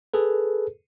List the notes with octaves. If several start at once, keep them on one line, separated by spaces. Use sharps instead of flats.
G#4 A4 B4